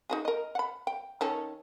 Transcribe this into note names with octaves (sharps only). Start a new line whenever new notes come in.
D#4 F#4 G#4
A#4 D#5
F#5 B5
G5
D#3 C#4 A4